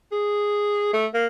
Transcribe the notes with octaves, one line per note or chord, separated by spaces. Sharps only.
G#4
A3
A#3